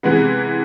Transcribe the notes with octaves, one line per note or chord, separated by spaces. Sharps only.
C3 E3 G#3 B3